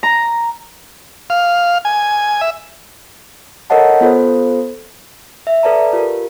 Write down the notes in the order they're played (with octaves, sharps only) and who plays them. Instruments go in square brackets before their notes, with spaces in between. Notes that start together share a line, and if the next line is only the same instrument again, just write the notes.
[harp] A#5
[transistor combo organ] F5
G#5
E5
[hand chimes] A4 A#4 C#5 D#5 F#5 A5
B3 F4 A4 C5
E5
A4 B4 D5 A5 A#5
F4 G4 A#4